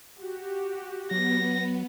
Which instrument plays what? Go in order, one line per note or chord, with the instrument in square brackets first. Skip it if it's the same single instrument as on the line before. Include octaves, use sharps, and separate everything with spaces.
[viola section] F#4 G4
[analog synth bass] F#3 [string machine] B3 [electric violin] A#6